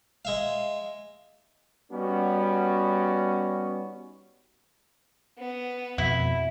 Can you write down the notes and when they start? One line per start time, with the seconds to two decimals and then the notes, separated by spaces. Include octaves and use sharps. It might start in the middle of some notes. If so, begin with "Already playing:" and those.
0.25 G#3 E5 F5
1.91 G3 B3 C#4 D#4 F#4
5.38 B3
5.98 F2 B2 E4